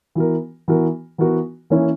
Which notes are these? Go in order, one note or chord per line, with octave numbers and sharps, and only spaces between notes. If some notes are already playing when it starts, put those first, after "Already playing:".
E3 B3 F#4 A#4
E3 B3 F#4 A#4
E3 B3 F#4 A#4
E3 A#3 C#4 E4